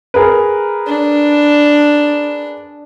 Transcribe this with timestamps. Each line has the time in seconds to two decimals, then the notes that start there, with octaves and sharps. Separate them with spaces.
0.14 G#4 A#4 B4
0.87 D4